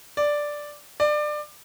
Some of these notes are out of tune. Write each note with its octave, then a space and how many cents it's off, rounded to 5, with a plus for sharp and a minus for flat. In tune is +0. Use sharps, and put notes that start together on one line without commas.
D5 +0
D5 +25